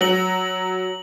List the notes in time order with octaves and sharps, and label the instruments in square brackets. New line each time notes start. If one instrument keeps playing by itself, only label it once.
[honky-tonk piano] F#3 [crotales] F#7